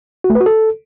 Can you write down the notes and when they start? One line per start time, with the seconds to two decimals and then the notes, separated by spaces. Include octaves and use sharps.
0.24 F#4
0.30 A3
0.35 B4
0.41 F#4
0.46 A4